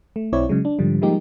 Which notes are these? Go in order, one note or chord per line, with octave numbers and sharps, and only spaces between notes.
A3
B1 C4 E4 C#5 D5
C#3 F#3 G#3
D4
G#2 D3 F3 G3
F3 G3 G#3 A#3 D#4 G4